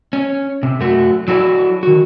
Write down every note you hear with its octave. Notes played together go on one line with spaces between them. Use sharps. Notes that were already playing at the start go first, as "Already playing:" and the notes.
C#4
C3
F#2 A3 F#4
F#3 E4 F#4 A4 D5
D#3 F#4